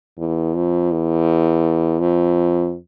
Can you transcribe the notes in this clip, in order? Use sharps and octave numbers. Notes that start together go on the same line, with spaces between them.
E2
F2
E2
F2